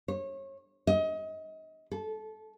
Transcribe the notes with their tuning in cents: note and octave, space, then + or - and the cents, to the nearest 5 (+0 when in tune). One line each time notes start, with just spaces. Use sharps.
C#5 -30
D#5 +30
A4 -20